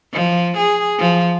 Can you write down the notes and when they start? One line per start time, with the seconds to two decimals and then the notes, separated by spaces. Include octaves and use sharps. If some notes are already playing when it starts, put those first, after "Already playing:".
0.13 F3
0.57 G#4
0.99 F3